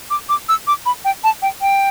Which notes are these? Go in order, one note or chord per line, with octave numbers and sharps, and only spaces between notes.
D6
D6
E6
D6
B5
G5
A5
G5
G5